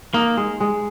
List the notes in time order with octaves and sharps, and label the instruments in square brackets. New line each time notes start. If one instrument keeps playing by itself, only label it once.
[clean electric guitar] A#3 [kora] D#4
[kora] G#3
G#3